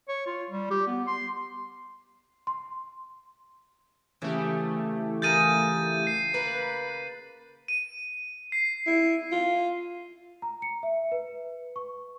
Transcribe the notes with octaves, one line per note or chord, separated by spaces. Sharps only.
C#5
F4
G3
G4
B3
C6
C6
C#3 E3 A3 G4
F4 G#4 A#4 G6 A6 D#7
C7
A#3 B4
D#7
C7
E4
F4
A#5
C#7
E5
B4
C#6